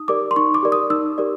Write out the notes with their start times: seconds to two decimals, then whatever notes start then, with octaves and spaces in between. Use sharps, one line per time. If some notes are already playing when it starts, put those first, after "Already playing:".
Already playing: D#4 D#6
0.08 G4 A#4 D5 D6
0.31 C6
0.36 D#4 C#6
0.54 D6
0.63 G4 A#4 D5
0.72 D#6
0.90 D#4 E6
1.18 G4 A#4 D5